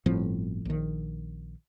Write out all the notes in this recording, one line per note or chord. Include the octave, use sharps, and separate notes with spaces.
G1 A2 F3 C4
A#1 D#3